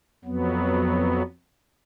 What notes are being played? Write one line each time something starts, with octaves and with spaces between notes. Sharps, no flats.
F2 F#3 B3